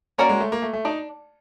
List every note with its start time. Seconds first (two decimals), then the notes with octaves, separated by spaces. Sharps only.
0.18 A#3 C#4 F#4 A#4 D5
0.29 G#3
0.40 A3
0.52 A#3
0.62 A3
0.73 A3
0.85 D4 D#4